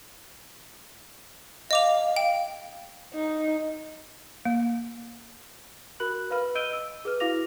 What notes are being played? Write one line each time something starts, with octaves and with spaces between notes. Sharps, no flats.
D#5 F5 D6 F7
G5
D#4
A#3
F#4 A#4 B5 F#6 F#7
B4 F5 B5 F6
D#5 E6 G6 D7 D#7 G7
E6
G#4 B4 F6
E4 F#4 F5 D6 A#6 F7